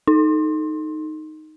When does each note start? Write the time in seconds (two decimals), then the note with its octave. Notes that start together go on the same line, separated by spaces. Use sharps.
0.07 D#4